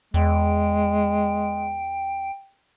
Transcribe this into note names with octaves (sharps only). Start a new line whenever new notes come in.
E2 G#3 G5